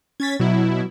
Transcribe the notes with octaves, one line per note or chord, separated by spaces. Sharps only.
C#4 G#6 A6 B6
B2 F#3 E4